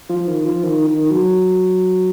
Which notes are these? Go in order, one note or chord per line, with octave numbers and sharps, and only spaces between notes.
F3
D#3
F3
D#3
D#3
F#3